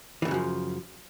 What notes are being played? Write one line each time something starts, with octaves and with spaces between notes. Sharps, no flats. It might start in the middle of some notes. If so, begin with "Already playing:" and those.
F#2 A2 C#3 E3 F3